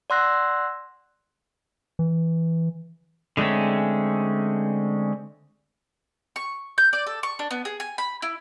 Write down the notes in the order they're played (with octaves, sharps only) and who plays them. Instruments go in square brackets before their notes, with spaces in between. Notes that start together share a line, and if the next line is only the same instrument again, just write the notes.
[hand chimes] D5 F#5 C6 E6 F#6 A#6
[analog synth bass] E3
[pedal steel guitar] D3 G#3 A3 C4 C#4
[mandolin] C#6
G6
D5
A4
C#6
D4
B3
G#4
G#5
B5
E4